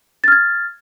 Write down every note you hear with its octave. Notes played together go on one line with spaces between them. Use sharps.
F6 G#6 A6